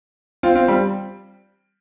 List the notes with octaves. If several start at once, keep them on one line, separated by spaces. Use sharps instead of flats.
C4 F4
C4 F4
G3 C4